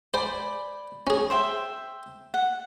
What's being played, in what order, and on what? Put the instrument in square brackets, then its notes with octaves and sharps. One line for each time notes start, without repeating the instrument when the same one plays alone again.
[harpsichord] C5 [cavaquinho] D5 G#5 B5
[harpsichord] C#4 G#4
[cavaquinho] C5 E5 G5
F#5